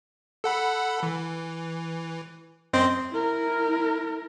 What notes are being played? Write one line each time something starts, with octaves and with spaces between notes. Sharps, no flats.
A4 F#5 B5
E3
F#2 C4 D#5
E4 A#4